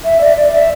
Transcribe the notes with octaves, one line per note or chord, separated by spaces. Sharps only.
E5
D5
D5
E5